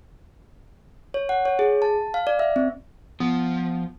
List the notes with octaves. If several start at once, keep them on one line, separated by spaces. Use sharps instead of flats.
C#5
F#5
C#5
G#4
A5
F5
D5
E5
C4
F3 B3